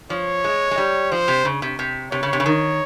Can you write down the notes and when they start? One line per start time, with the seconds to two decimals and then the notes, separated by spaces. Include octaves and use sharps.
0.10 F3 C#5
0.44 G#3
0.71 G#3
0.78 G3
1.11 F3 C5
1.28 C3
1.45 C#3
1.62 C3
1.79 C3
2.12 C3 C#5
2.23 C#3
2.33 C3
2.40 C#3
2.46 D#3